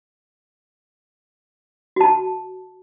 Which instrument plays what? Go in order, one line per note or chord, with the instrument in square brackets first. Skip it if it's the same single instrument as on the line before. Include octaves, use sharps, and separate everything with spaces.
[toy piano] F#4 A5